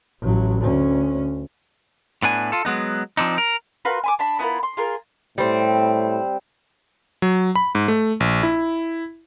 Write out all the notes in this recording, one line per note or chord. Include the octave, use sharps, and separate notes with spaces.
A1 F#3
D2 C#4
A2 B3 D4 G#5
F4 A4
F#3 G#3 B3 D#4
F3 C4 D4 D#4
A#4
F4 F#4 A#4 B4
G#5 B5 D6
D4 A5 B5
B3 E4 F4 A#4
C6
F4 G#4 A#4
A2 G3 C4
F#3
B5
G#2
A3
A#1
E4